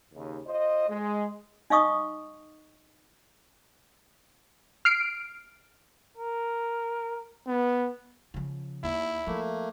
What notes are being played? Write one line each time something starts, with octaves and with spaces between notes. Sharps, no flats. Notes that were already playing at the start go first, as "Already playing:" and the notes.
D#2 C#3
F4 C5 D#5
G#3
D#4 D#5 F5 C#6 D#6
F6 C7 D7
A#4
B3
C#3 F3
D#2 E4
F3 A3 A#3